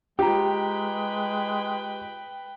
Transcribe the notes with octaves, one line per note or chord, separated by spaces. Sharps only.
G#3 F4 G4 B4 G5 A#5